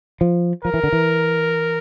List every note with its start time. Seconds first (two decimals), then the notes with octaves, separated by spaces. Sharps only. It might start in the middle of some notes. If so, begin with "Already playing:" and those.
0.21 F3
0.65 F3 A#4
0.74 E3
0.83 D3
0.92 E3